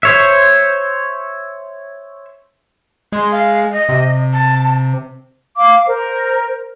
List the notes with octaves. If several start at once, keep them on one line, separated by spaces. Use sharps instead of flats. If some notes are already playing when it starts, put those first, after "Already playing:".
C5 C#5 E5
G#3 C6
F5
D#5
C3
A5
F5 D6
A#4 C5